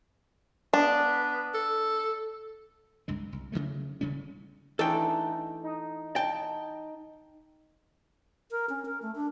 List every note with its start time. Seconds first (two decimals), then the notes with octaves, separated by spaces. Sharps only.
0.74 B3 D4
1.54 A4
3.08 C2 G2 G#3
3.33 C2
3.52 C#3 E3 F#3 A3
4.01 D#1 C#3 G3 C#4
4.79 E3 A3 D4 D#4 A4 G5
5.63 D#4
6.16 G5 A5
8.51 A#4
8.70 C#4
8.85 A#4
9.02 A3
9.15 D4